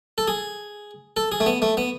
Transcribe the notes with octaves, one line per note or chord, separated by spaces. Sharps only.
A4
G#4
A4
G#4
A3
B3
A3
B3